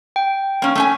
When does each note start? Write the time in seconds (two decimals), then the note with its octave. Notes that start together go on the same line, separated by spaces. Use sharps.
0.16 G5
0.62 A#3 C#4
0.75 A3 C#4 G#5